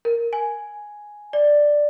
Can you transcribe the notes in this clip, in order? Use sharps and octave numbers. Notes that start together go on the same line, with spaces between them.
A#4
G#5
D5